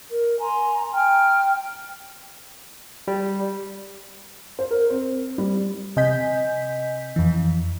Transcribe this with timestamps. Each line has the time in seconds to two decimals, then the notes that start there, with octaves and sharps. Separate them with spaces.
0.10 A#4
0.39 G#5 A#5 C6
0.93 G5 F6
3.08 G3
4.59 C5
4.71 A#4
4.90 C4
5.38 G3
5.97 C3 D#5 G#5 G6 B6
7.16 F2 E3